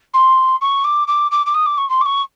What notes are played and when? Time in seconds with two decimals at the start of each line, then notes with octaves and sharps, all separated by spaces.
0.13 C6
0.61 C#6
0.84 D6
1.07 D6
1.31 D6
1.46 D6
1.54 D#6
1.66 D6
1.77 C#6
1.89 C6
2.01 D6
2.05 C#6